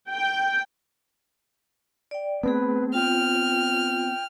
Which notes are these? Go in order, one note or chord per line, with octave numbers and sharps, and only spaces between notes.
G5
D5 G5
A3 B3 C4 G#4 B4
F4 G5 F6